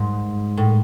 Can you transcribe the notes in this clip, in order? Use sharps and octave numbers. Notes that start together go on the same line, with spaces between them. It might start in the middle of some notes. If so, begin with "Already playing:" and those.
Already playing: G#2
A2